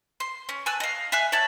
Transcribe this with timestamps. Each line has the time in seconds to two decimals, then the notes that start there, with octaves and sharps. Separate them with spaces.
0.20 C6
0.49 C#4
0.66 G#5 A5 E6 F#6
0.80 D#5 F5
1.12 E5 F5 G#5 F#6
1.32 C#5 D5 E5 A5